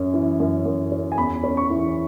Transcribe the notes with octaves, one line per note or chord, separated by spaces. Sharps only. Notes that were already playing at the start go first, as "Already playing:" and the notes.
Already playing: F#2 C#4
E3
F#2
F#2
C#4
G#5
E2 B5
C#4
C#6
E3